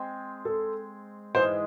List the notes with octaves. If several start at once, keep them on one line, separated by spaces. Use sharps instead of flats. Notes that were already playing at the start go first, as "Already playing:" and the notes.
Already playing: G#3 C4
A4
G#2 E3 G#3 C5